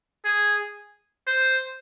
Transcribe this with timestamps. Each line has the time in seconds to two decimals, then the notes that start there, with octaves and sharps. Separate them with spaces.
0.25 G#4
1.27 C5